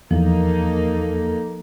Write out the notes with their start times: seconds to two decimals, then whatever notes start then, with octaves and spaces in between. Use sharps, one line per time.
0.11 E2 F3 A#3 D#4 A4